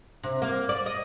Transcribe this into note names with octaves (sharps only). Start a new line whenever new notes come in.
C3
A#3
D5
D#5